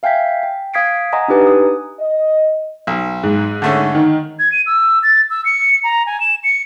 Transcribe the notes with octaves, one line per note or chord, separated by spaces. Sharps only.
E5 F5 G5 G#5 G6 B6
G5
F5 D#6 G#6 B6 C7 D7
D#5 F#5 G#5 A#5 C6 D#6
D4 D#4 G4 B4 G#5 A#5
D#6
D#5
B1
G#2
D3 A3 C#4
D#3
G#6
D#7
E6
A6
E6
C#7
A#5
G#5
E7
C#7